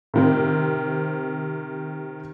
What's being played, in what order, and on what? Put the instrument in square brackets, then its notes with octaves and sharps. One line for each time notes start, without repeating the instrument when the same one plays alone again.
[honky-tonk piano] C3 D#3 C4